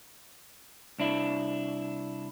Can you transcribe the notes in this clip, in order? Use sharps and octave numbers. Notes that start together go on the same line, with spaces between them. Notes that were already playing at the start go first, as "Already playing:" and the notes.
C2 D4 E4